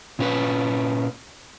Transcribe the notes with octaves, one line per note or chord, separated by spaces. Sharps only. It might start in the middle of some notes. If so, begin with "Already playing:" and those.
A#2 C#4 B4